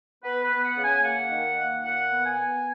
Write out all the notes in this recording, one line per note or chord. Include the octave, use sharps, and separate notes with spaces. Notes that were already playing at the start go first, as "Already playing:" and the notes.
B3 B4
B4
B3
F#5
C#3
G#5
A#3 F#5
D#3
A#3
A#2 F#5
B3
G#5
B3